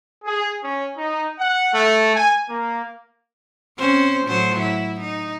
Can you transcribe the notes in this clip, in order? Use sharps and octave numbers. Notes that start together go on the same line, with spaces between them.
G#4
C#4
D#4
F#5
A3
G#5
A#3
C4 C#4 C5
A2 F#3 C5
E4
D#4